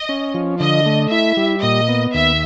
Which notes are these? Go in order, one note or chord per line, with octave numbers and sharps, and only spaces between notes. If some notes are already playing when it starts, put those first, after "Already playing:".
Already playing: D#5
C#4
F3
D3 D#5
A3
E4 E5
G3
A#2 D#5
B3
D#2 E5